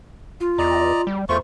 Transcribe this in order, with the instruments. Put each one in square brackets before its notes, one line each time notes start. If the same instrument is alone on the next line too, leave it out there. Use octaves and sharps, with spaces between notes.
[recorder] F4
[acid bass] E2 [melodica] D5 D#5 A#5
[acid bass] G3
[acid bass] E2 [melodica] A3 F4 C#6 [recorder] C5